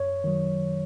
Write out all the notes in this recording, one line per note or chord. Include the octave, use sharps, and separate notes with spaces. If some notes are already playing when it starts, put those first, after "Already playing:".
Already playing: F#2 C#5
D#3 F#3